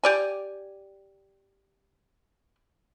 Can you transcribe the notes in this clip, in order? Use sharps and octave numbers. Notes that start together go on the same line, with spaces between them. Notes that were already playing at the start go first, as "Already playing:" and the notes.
G4 D5 G#5